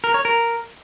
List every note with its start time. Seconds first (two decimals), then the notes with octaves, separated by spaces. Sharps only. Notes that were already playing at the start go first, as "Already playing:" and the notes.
0.04 A#4
0.14 C#5
0.25 A#4